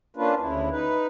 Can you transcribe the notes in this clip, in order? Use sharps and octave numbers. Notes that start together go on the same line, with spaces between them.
A#3 C#4 D4 F4 B4
D2 C#3 E4
D#4 B4